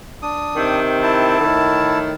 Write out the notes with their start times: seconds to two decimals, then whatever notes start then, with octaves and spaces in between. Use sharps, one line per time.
0.22 D4 D#6
0.56 C3 D#3 C4
1.02 E4 A5
1.39 A2 D#3